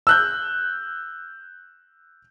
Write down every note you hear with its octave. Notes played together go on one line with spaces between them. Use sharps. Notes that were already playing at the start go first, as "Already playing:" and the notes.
E6 F#6 G6